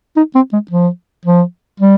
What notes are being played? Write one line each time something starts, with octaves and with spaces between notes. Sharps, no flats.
D#4
C4
G#3
F3
F3
G3